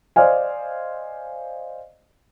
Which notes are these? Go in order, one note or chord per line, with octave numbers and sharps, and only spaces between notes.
C5 D5 D#5 F5 G#5